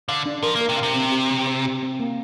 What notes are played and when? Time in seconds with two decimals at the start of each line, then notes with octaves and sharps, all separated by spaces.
0.09 D3 F5
0.26 D4
0.43 F3 A#4
0.55 A#3
0.61 A#4
0.69 C3
0.77 F5
0.83 C3
0.96 C4
1.12 G4
1.31 C4
1.47 C5
1.65 G4
1.83 C4
2.00 A#3